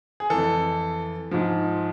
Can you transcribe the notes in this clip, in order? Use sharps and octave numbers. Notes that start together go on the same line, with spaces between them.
G#4
F2 E3 A4
G#2 F3